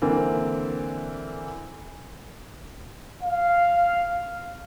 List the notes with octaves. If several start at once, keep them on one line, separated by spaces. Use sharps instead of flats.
D3 E3 A#3 C4
F5